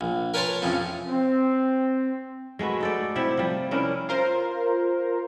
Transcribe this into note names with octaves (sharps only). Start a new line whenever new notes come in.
A#1
A#4 B4 C#5 A5 A#5 C6
F2 A2 C#3
C4
G#3 A3 F#4 B4
D#4 A4 D5
C3 E4 G4 E5
F3 G3
C#4 D4 E4 A#4
F4 A#4 C5